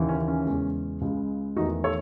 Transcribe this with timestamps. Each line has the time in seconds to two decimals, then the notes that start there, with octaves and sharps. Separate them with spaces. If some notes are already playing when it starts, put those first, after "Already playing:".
Already playing: D#2 C#3 E3
0.09 C#4
0.28 C#4
0.46 E2 C#3 G#3
1.01 C#2 C#3 G#3
1.56 E2 D#3 A3 D#4 F#4
1.84 A4 C#5